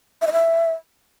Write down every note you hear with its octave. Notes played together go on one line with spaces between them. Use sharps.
E5
D#5
E5